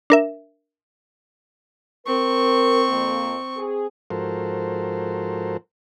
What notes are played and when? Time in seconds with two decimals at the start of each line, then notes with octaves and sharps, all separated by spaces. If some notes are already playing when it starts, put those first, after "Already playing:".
0.10 D4 A#4 E5
2.06 C4 A#4 C#6
2.90 F2 A#3
3.56 G#4
4.10 G#2 F3 F#4 A4 A#4 C5